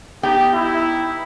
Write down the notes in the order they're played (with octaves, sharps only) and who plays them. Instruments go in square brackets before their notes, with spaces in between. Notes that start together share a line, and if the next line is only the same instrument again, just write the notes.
[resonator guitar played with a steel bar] B3 D#4 G5 [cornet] G4
[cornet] E4